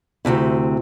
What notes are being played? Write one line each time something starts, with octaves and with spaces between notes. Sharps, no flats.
D2 G2 C3 E4